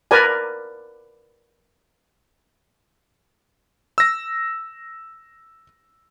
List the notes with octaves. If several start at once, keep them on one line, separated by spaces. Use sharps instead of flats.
A#4 B4 D5 G#5
E6 A#6